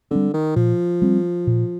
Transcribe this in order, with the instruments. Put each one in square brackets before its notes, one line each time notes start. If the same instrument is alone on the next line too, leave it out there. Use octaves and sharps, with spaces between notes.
[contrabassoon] D3 [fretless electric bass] G3 C4
[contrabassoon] D#3
[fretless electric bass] A#2 [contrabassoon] F3
[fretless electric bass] G3 C4
A#2